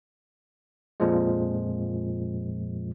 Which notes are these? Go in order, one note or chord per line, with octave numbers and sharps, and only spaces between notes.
F2 A#2 F3 G#3